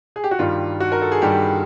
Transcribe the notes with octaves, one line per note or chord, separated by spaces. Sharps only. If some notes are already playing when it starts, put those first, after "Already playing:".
G#4
G4
F#4
G2 D#3 G3 F4
F#4
A#4
A4
G#4
G2 D#3 G3 G4